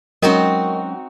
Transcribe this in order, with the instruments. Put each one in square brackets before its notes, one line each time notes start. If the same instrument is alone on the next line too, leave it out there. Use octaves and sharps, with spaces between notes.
[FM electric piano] F#3 G#3 C#4 [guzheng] C4 D#4 F#4 [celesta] A#4 D#5